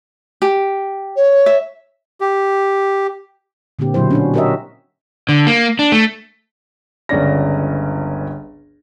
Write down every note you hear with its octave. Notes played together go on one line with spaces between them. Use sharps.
G4
C#5
E5
G4
A#2 D3 A#3 C4 G4
B2 D3 F#3 E4 C5
C#4 D4 F#4
F#4 G4 A#4 C#5 D#5 E5
D3
A#3
D4
A3
G1 C#2 C#4 D5 A#6